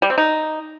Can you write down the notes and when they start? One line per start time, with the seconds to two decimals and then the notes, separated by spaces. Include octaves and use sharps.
0.02 G3
0.10 C4
0.18 D#4